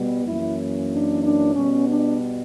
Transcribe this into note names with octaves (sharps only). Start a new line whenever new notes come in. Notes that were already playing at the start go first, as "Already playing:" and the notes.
Already playing: B2 G3 B3
F#2 E3 A#3 C#4 E4
D4
D4
B2 G3 B3 C#4
D4